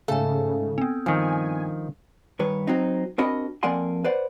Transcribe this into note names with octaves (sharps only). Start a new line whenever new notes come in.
G#2 C#3 A3 A4 F5 G#5
B3 C4
G2 D#3 F3 G#5
G2 D#3 B4 C#5
F#3 C4 D#4
C4 D4 F#4 A#4 D#5 B5
F2 A#3 D5 F#5 G#5 C6
B4 C5 D5 F#5